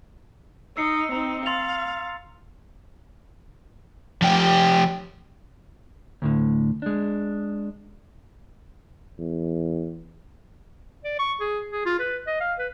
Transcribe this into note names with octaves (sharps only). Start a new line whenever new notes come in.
D#4 E6 C7 C#7
C4 D#4 A#5
F5 C6 A6 F7
F3 G4
D2 A2 D3
G#3 D4
E2
D5
C#6
G#4
G#4
F4
B4
D#5
F5
B4